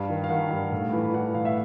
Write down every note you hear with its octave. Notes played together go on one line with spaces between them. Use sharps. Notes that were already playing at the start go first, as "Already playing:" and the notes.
Already playing: G2 F5
D#3
F5
D#3 F#5
G2
A2 F5
E3
E3 F#5
A2 F5
E5